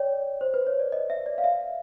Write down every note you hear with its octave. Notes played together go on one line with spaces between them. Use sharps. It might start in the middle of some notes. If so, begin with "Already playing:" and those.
Already playing: C#5 D5 G5
C5
B4
C#5
D5
D#5
E5
D5
F5
E5